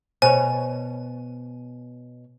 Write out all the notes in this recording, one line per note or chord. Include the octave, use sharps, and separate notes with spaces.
B2 C5 C#5 G#5